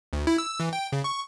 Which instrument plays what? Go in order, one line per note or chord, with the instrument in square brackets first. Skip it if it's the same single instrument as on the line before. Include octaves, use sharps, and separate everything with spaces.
[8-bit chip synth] D2
E4
E6
E3
G5
C#3
C#6